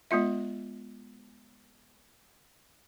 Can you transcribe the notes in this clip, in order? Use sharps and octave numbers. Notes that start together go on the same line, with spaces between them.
G#3 B3 F4 E5